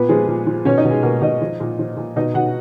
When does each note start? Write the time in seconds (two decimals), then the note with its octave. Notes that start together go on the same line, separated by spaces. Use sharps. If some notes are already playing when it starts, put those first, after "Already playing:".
Already playing: A#2 B3 B4
0.09 F3 G#3 G#4
0.28 A#2
0.47 F3
0.65 B2 C#4 C#5
0.78 D#4 D#5
0.84 B2
0.90 G#3 G#4
1.03 B2 A#3 A#4
1.21 B2 D#4 D#5
1.41 F3
1.60 A#2
1.79 F3
1.97 A#2
2.16 B2 D#4 D#5
2.34 B2 F#4 F#5